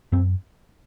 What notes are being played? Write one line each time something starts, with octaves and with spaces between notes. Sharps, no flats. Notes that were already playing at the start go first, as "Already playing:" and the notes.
F#2 C4